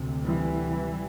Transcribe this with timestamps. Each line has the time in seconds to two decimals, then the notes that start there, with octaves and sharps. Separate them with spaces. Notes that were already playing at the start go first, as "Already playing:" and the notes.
Already playing: D2 C3
0.25 E3 G3